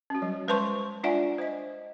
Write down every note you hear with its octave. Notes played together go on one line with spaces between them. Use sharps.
C#4 F#4
F#3 G3
G#3 B4 C5 A5 C6 C#6
D4 F4 D5 E5 F#5 G#5
C5 D#5